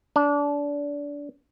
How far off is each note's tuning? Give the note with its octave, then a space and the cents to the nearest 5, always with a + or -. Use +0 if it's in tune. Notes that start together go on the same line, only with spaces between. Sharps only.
D4 -25